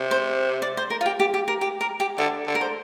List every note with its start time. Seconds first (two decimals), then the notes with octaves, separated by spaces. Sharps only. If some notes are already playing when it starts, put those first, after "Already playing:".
Already playing: C3
0.11 C5
0.62 D5
0.77 C5
0.90 A#4
1.01 F4
1.06 G4
1.20 G4
1.34 G4
1.48 A#4
1.61 G4
1.81 A#4
2.00 G4
2.18 D3 D5
2.47 D3
2.55 A#4
2.61 C5